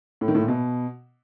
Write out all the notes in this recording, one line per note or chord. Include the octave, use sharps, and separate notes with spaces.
A2
D#3
A2
A#2
B2